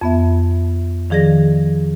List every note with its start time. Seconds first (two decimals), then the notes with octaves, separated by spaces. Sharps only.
0.01 F2 B3 E5
1.10 D#3 F3 G#4 D5 A#6